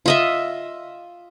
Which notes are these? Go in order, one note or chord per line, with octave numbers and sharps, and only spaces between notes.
F4 D#5 E5